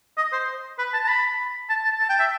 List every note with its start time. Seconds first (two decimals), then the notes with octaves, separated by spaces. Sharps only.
0.17 D#5
0.32 C5
0.79 B4
0.94 A5
1.04 A5
1.08 B5
1.69 A5
1.84 A5
2.00 A5
2.09 G5
2.19 E5